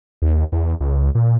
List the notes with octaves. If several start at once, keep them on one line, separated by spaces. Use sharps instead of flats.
D#2
E2
C#2
A#2